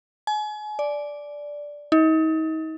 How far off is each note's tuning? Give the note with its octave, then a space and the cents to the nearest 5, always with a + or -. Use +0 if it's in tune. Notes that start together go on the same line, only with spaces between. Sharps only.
G#5 +35
D5 -5
D#4 +35